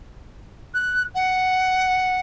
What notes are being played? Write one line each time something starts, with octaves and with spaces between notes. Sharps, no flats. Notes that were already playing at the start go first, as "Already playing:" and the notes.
F#6
F#5